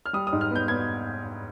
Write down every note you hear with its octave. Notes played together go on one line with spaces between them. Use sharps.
F6
G3 D#6
D#6
G#2
F6
B3 G6
B3 G#6